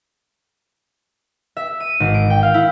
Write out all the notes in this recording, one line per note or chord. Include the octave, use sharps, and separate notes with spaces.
E5
D#7
G#1
D7
G5
F5
E4